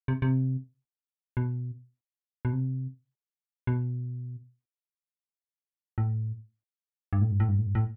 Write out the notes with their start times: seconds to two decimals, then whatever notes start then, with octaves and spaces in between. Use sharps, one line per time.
0.08 C3
0.22 C3
1.37 B2
2.45 B2
2.53 C3
3.67 B2
5.98 A2
7.13 G2
7.21 A2
7.31 G2
7.40 A2
7.48 G2
7.58 A2
7.67 G2
7.75 A2